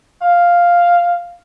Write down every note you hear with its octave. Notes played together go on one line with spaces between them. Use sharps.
F5